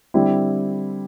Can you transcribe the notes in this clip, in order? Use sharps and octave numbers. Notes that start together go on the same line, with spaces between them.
D3 G3 C4 E4